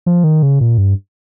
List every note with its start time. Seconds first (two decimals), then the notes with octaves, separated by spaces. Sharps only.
0.06 F3
0.24 D#3
0.43 C#3
0.61 A#2
0.78 G2